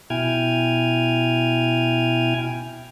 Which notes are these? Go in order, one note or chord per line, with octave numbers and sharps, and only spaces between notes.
B2 E4 G5 G#5 F6 G#6